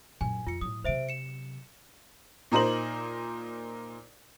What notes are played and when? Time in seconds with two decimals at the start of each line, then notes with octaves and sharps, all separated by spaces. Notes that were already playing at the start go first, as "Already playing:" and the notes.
0.21 F#2 A#2 G#5
0.47 F2 F4 C#7
0.61 A2 F#3 D#6
0.84 C3 F#3 C5 E5 D7
1.09 C#7 E7
2.52 A#2 D#4 A#4 C5 F#7